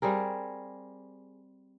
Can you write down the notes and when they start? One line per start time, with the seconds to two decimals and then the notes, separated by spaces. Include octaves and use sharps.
0.02 G3 C4 G#4 A#4